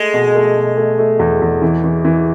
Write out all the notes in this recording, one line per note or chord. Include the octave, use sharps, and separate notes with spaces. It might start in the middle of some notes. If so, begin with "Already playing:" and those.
Already playing: G#3 A3
B2
A3
B2
A3
A3
E2
E2
E3
E3
E3